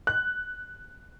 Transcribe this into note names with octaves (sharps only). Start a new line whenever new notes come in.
F#6